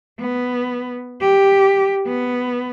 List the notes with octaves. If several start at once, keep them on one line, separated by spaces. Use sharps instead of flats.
B3
G4
B3